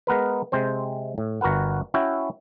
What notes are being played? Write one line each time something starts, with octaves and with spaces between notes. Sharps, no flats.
G#3 B3 A#4 B4
C3 G#3 C4 C5
A2
G1 F#4 A#4 B4 F#5
C#4 E4 F#4 G5